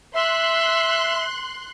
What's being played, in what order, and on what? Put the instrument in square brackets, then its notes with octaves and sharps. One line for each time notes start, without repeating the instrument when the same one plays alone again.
[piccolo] E5 [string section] C6 F#6